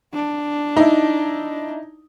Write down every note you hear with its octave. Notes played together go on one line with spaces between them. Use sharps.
D4
D#4 E4